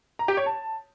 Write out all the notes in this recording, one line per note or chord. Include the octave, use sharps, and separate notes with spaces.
A#5
G4
C#5
A5